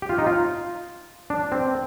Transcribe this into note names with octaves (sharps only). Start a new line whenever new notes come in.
G4
F4
D#4
F4
D4
C4